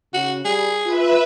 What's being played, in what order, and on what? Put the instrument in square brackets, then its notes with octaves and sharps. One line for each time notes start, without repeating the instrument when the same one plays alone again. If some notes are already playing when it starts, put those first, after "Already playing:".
[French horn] C#3 [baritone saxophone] F#4
[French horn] G3 [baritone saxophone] G#4
[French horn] F4 [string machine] B4 E5